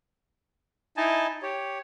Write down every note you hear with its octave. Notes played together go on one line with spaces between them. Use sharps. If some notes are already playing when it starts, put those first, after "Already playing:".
D#4 E4 D#5 G#5 A5
G4 C#5